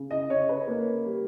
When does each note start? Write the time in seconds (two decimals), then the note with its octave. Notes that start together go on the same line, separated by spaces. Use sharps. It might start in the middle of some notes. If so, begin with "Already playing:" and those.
Already playing: C#3
0.11 D#5
0.30 C#3 C#5
0.49 B4
0.67 A#3
1.05 G3